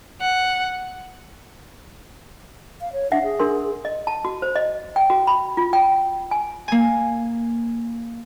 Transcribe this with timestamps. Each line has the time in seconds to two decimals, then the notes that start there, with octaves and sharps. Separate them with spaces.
0.21 F#5
2.81 F5
2.93 C#5
3.12 D4 E5 F#5
3.24 G#4
3.40 D4 A#4 C6
3.85 D#5
4.07 A5
4.25 F#4
4.42 C5
4.56 D#5
4.96 G5
5.10 F#4
5.27 B5
5.57 F4
5.73 G5
6.31 G#5
6.68 A#3 G#5